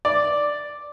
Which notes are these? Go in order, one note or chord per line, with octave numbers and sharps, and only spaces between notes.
D5